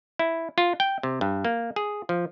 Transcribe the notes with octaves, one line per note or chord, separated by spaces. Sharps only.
E4
F4
G5
C3
G2
A#3
G#4
F3